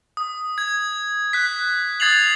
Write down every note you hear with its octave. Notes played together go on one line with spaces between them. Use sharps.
D#6
G#6
F#6 B6
D#6 G#6 A6 C7 F7 F#7